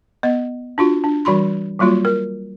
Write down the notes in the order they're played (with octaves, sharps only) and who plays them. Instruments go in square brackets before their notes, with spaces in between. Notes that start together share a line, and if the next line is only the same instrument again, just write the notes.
[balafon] B3 D#5
D4 F4 F#4
D4
E3 G3 F#4 B5 C6
F#3 G3 A#3 F4 F#4
A#4